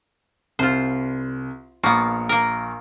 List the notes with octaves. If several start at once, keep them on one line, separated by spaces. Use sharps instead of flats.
C2 F4 C5
A#1 A#3 B3 C#6
A#3 A#4